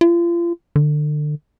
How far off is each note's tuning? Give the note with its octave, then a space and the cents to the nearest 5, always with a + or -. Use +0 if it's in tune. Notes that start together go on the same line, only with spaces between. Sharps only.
F4 -35
D3 +30